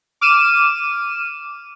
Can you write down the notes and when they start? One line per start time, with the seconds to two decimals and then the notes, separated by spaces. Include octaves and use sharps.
0.21 D6 F6 D#7 E7